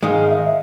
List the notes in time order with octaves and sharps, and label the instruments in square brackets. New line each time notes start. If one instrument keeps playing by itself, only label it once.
[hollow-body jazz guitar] G#2 D#3 G#3 [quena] F5
[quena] E5
D#5
E5